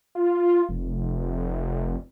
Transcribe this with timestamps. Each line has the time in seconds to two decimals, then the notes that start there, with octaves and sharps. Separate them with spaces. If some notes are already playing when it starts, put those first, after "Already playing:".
0.15 F4
0.69 F1